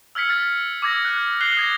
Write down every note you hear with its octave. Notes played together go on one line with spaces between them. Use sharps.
E6 F6 G#6 B6 C#7
F6 A6
D6 E6 G#6 A#6
F#6
F#6 C7 F7 G7
D#6 G#6 A#6